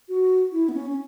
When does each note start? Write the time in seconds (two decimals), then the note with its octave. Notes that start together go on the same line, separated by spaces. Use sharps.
0.09 F#4
0.52 E4
0.69 B3
0.74 C#4
0.90 C#4